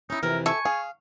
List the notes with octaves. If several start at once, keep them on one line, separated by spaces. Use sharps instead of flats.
C#4 D#4 E4
F2 C3 E3 A#4
A4 E5 G#5 C#6
G#4 F5